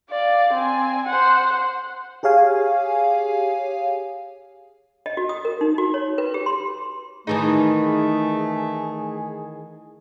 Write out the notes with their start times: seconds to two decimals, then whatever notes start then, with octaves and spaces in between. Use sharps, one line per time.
0.10 D5 F5
0.53 C4 G#5
1.06 C5 F#5
2.23 G4 G#4 C#5 F5 G#5
5.06 D#5
5.17 F#4
5.29 D#6
5.45 A#4
5.61 D#4
5.78 F#4
5.94 C#5
6.18 B4
6.34 G4
6.46 C6
7.27 D#3 E3 A3 D#4 G#4